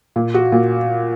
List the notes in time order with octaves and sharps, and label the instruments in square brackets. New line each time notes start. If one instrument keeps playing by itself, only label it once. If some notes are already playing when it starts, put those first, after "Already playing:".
[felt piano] A#2
F#4
A#2